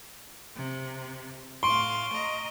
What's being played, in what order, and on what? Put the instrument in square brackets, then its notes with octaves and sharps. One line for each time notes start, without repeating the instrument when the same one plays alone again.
[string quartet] C3
[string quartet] A2 F5 [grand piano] C6 [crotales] C#6 D7 G7
[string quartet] D#5 A#5